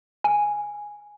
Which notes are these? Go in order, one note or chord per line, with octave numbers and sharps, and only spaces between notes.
G#5